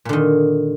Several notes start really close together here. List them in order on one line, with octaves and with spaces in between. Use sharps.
A#2 D3 D#3